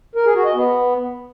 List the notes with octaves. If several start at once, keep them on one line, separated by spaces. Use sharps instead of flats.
A#4
G#4
F#4
D#5
B3